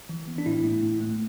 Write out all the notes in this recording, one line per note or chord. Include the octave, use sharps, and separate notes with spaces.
E3
B3
D4
A2 E4
A3
A2
A3